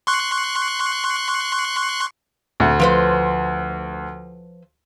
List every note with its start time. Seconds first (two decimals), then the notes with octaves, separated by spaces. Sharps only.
0.07 C6 C#6 F#6
2.60 D2
2.80 F3 B4 C5